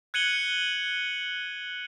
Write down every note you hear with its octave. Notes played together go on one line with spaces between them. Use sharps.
F#6 G#6 C#7 D#7 F#7 G7